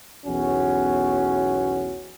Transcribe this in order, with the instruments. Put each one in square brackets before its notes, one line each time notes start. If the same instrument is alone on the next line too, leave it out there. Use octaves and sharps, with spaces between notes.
[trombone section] B1 E2 C#4 F#4